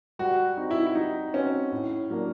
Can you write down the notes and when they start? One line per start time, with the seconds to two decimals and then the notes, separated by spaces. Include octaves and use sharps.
0.19 G3 F#4
0.57 C4 D#4 F#4
0.71 E4
0.86 E4
0.95 G3 D#4
1.33 C4 C#4 D#4 F#4
1.72 A2
2.10 F#3 A#3 D4